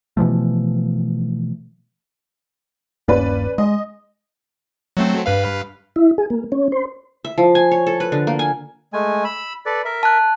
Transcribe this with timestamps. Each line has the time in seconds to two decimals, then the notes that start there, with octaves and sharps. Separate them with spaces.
0.17 B2 E3 F3 A3
3.08 D#1 G2 A#3 C#4 B4 D5
3.58 G#3 D#5
4.97 F#3 A3 C4
5.26 G2 B4 F5
5.96 E4
6.18 G#4
6.30 A#3
6.52 C#4
6.72 C5
7.25 E5
7.38 F3
7.55 G#5
7.71 C#5
7.87 A4
8.00 B4
8.12 D3
8.27 A#3
8.39 G#5
8.93 G#3 A3 G#5
9.24 B5 E6
9.66 A4 B4 D5
9.85 A#4 E5
10.03 A5 F#6